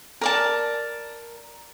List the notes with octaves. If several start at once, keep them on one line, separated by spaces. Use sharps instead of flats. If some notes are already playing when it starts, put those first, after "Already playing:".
A#4 D5 A5